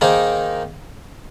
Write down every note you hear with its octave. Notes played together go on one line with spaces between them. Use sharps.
D#3 A#3 D#4 G#4 C5